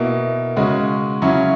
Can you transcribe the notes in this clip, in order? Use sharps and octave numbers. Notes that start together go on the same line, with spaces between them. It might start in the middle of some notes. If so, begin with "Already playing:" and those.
Already playing: B2 A#3 E4
C#3 G#3 C#4 F#4
C#3 F#3 C#4 E4